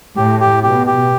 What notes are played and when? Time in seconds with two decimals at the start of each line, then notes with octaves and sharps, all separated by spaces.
0.17 A2 G4
0.41 G4
0.63 B2 G4
0.87 G4